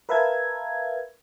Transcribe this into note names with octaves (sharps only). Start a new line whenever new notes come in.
A#4 B4 E5 F5 A5 G#6